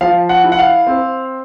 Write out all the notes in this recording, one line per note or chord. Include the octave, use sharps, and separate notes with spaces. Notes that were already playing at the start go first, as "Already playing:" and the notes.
F3 F5
F#5
E4
F#5
F5
C4